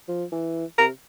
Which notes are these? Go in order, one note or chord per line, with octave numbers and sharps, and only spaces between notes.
F3
E3
C3 A#4